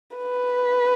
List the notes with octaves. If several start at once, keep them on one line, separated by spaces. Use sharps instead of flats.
B4